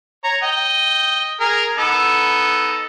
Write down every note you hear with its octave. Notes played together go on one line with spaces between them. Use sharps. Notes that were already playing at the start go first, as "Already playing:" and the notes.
C#5 A#5
D#5 G5
G#4 A#4
B3 D#4 A4